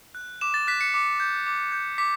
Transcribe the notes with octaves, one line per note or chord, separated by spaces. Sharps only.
F#6
D6 E7
A6
F#6 B6
C#7
D6
G6
D6
G6
D6 B6